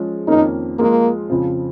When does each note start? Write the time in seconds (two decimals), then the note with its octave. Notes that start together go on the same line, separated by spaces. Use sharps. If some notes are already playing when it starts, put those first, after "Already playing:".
Already playing: F3 G#3 C#4
0.27 F2 D#3 A#3 C#4 D#4
0.79 F3 G#3 A#3 F4 G#4
1.30 F2 C#3 F3